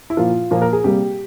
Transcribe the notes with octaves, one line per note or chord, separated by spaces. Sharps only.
E4
A#2 F3 A#3 F4
A#2 F3 A#3
A#4
G#4
C3 G3 A#3 G4